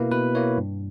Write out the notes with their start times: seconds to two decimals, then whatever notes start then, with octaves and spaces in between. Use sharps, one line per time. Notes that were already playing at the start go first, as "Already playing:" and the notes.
Already playing: B2 A#3 E4 B4
0.11 B2 B4
0.35 A#3 E4 C#5
0.58 G2